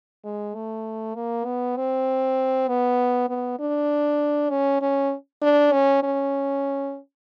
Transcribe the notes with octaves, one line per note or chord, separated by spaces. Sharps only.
G#3
A3
A#3
B3
C4
B3
B3
D4
C#4
C#4
D4
C#4
C#4